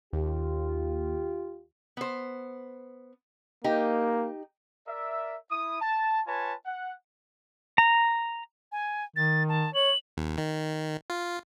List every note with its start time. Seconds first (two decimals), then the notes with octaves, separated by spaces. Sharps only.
0.13 D#2 F4 G4
1.97 B3 C5
3.64 A#3 D#4 G4
4.87 A#4 D5 E5
5.50 E4 D#6
5.80 A5
6.26 F4 B4 C#5 G#5 A5
6.66 F#5
7.78 A#5
8.72 G#5
9.16 D#3 A6
9.49 A5
9.74 C#5 F#7
10.17 D#2
10.38 D#3
11.10 F4